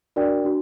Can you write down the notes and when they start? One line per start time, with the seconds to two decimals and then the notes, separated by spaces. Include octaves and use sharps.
0.16 D4 F#4 A#4 D5 G5
0.45 D4 F#4